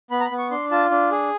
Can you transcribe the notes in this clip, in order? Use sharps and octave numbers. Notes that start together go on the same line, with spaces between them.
B3 B5
A#5
B5
B3
C#6
D4 C6
F4 A5
D4
G#4